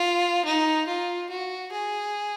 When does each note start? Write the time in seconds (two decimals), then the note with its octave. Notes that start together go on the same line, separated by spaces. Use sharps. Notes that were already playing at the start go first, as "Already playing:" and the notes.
Already playing: F4
0.45 D#4
0.87 F4
1.30 F#4
1.72 G#4